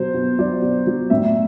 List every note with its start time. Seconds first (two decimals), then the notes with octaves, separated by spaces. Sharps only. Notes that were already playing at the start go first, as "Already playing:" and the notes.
Already playing: B2 F#3 C5
0.14 B2
0.39 F#3 D5
0.62 B2
0.87 F#3
1.10 A2 E5